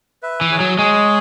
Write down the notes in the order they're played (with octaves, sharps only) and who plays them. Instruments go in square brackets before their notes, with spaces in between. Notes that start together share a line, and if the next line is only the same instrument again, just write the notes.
[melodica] B4 E5
[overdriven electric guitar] E3
[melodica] G#4 C#5
[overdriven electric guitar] F#3
[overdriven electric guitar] G#3 [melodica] G#4 C#5